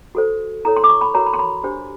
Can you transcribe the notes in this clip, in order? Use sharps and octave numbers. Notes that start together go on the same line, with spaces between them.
F#4 A4 C5
E4 A4 C#5 A#5
C6
D6
C#6
B5
F#4 A#4 C#5 A#5
B5
C6
B5
D4 G4 C5